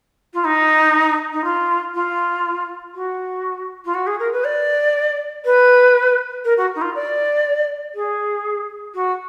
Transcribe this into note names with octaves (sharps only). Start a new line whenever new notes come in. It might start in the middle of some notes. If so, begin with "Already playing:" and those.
F4
D#4
D#4
F4
F4
F#4
F4
F#4
G#4
A#4
B4
D5
B4
A#4
F#4
D#4
F4
D5
G#4
F#4